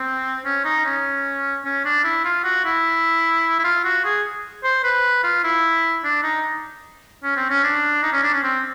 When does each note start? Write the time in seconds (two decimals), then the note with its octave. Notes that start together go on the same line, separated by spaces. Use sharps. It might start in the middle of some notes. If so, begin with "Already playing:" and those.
Already playing: C4
0.45 C#4
0.65 D#4
0.85 C#4
1.65 C#4
1.85 D4
2.04 E4
2.25 F4
2.44 F#4
2.65 E4
3.59 E4
3.64 F4
3.85 F#4
4.05 G#4
4.64 C5
4.84 B4
5.24 F4
5.44 E4
6.04 D4
6.24 D#4
7.24 C#4
7.37 C4
7.50 C#4
7.64 D4
8.03 D#4
8.13 C#4
8.23 D4
8.33 C#4
8.43 C4